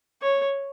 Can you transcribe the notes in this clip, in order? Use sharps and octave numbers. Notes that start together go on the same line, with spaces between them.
C#5